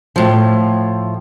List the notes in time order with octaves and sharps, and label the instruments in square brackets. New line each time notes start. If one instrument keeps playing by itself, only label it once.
[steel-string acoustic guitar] A2 F3